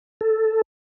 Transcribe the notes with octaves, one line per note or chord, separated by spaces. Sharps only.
A4